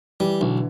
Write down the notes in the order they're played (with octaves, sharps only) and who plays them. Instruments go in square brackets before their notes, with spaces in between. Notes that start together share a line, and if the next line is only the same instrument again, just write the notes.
[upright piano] E3 [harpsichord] G3
[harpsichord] B1 [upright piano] D3